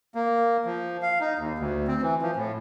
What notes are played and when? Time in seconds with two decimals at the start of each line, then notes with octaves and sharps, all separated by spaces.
0.15 A#3
0.65 F3
1.02 F5
1.21 D#4
1.39 D#2
1.59 D2
1.87 C4
2.02 E3
2.22 F3
2.36 A2